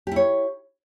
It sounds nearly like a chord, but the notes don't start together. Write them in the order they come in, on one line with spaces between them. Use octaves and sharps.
G4 E4 C#5